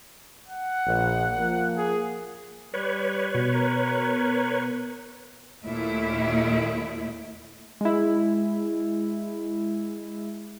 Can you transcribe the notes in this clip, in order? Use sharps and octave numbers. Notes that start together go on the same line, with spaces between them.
F#5
A#1
F3 A#3
G#4
G3 B4 C#5
B2
A#4
D#2 A#2 A3 E4
G#3 E4